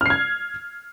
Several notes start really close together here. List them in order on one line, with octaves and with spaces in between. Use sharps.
F6 C7 G#6